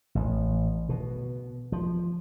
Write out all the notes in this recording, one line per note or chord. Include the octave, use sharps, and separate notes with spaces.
A1
B2
F3